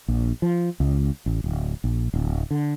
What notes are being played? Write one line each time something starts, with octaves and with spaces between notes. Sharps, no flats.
A#1
F3
C#2
A1
D1
A#1
D1
D3